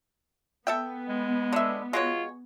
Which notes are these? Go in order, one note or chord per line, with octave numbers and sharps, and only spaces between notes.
B3 A4 E5 G5
G#3
D3 E5
G#3 F4 F#4 C#5